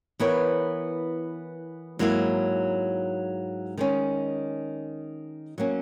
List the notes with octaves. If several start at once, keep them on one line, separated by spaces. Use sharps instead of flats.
E3 B3 E4 A#4 C#5
G#2 F#3 A#3 E4
D#3 G#3 C#4
F#3 A#3 C#4